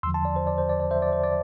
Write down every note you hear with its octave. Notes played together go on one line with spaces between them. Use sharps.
E2 D3 F3 C6 E6
A5 C6
D5
C5
D5
C5
D5
D5
C5 E5
D5
C5
D5